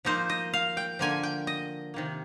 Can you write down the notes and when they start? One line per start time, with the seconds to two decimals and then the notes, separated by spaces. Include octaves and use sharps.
0.05 F3 A#3 D#4 C5
0.29 D#5
0.54 F5
0.77 G5
0.99 D3 F3 A#3 G#5
1.23 G5
1.47 D#5
1.94 C3 D#3 A#3